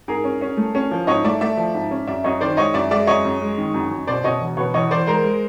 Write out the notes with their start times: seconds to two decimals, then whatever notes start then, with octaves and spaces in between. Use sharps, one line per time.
0.08 G#2 G#4 A#4
0.24 C#4
0.41 C#4
0.57 A3
0.75 C#4
0.91 F3
1.07 G#2 C#5 D#5
1.25 A3 D5 E5
1.41 A3 D5 E5
1.57 F3
1.75 G#2
1.91 C#4
2.08 F#2 D5 E5
2.24 F#2 C#5 D#5
2.41 D#3 C5 D5
2.57 G#3 C#5 D#5
2.74 F#2 D5 E5
2.91 G#3 D5 E5
3.07 F#2 C#5 D#5
3.25 F#2
3.41 G#3
3.58 D#3
3.74 F#2
3.91 F#2
4.07 B2 C5 D5
4.24 B2 C#5 D#5
4.40 E1
4.57 B2 B4 C#5
4.74 E2 C#5 D#5
4.91 E2 C5 D5
5.07 G#3 A#4 C5
5.24 G#3